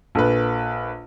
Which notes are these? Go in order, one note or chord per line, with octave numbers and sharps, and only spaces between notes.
A#1 A4 B4